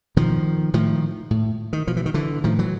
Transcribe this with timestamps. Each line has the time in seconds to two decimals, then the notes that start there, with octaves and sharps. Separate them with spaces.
0.16 B2 D#3 F3
0.74 A2 D#3 F3
1.31 A2
1.73 D#3
1.87 B2 F3
1.97 E3
2.06 D#3
2.14 D3 E3
2.44 A2 D#3 F3
2.59 E3 F#3